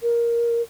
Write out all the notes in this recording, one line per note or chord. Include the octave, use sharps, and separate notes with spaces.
A#4